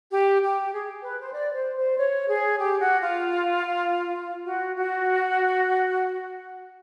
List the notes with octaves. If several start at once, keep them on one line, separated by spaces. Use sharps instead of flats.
G4
G4
G#4
B4
C5
D5
C5
C5
C#5
G#4
G4
F#4
F4
F#4
F#4